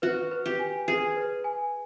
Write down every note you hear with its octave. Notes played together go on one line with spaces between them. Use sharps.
F#4 B4
B4
G4
G#5
G#4 B4
B4
G#5